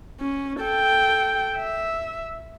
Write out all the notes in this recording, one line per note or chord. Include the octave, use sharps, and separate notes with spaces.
C#4
A4 G5
E5